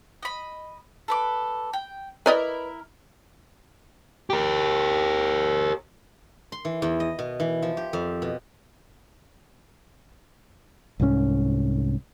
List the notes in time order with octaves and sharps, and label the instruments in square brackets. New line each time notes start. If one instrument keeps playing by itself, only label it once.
[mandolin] D#5 B5
A4 B4 D6
G5
[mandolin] E4 A#4 [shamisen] B4 D5 D#5
[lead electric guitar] G4 A#4
[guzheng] C6
E3
E2
D#5
B2
E3
F3
G4
F2
B2
[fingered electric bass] C2 G#2 F3 C#4